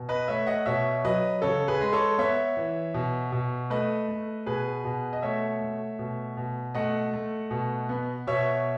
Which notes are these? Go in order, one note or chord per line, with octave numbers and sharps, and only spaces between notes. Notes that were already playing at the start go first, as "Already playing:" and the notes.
Already playing: B2
B4 D#5
A3 C#5 E5
D#5 F#5
B2 C#5 E5
F#3 B4 D#5
C#3 A4 C#5
G#4 B4
G#3
A4 C#5
B3 C#5 E5
E3
B2
B2
A3 B4 D#5
A3
B2 G#4 B4
B2
D#5
A3 C#5 E5
A3
B2
B2
A3 D#5 F#5
A3
B2
B3
B2 C#5 E5